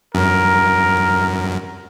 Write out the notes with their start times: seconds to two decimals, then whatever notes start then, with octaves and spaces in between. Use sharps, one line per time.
0.15 F#2 A#4